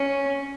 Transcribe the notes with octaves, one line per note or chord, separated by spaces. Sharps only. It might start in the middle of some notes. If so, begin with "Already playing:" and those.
Already playing: C#4